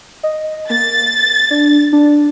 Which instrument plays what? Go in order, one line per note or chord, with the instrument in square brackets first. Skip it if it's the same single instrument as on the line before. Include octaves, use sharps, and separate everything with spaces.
[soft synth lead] D#5
[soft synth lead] A#3 [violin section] A6
[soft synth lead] D4
D4